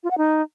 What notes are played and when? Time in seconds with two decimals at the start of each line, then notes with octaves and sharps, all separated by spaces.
0.04 F4
0.11 F#5
0.18 D#4